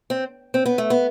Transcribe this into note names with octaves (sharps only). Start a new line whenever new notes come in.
C4
C4
B3
A3
B3